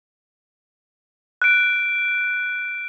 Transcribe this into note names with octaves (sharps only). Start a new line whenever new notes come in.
F#6 D7